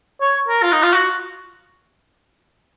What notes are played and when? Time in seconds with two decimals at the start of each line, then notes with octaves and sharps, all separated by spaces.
0.21 C#5
0.48 A#4
0.63 F4
0.72 D#4
0.83 F4
0.94 F#4